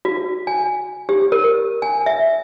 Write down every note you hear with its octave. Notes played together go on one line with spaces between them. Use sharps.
F#4
G#5
G4
A#4
G#5
E5